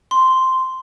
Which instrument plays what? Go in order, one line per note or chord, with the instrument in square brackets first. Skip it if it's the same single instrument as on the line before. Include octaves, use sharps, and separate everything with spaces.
[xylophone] C6